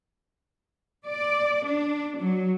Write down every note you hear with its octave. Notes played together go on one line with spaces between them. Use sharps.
D5
D4
F#3